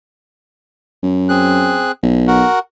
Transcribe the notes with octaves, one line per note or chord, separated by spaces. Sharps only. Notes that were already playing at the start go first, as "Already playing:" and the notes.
F#2
C4 G#4 F#6
B1
F#4 A#4 F#5